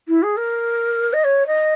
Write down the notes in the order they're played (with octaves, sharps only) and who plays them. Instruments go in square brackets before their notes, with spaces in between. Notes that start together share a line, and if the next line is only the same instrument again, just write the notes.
[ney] E4
G#4
A#4
D#5
C#5
D#5